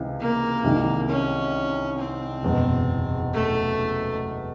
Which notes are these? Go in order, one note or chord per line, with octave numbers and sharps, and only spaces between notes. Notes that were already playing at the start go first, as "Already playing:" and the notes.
Already playing: C#2 C3 E3
A#3
C2 C3 D#3 G#3
C#4
C4
F#1 E2 B2 G#3
A3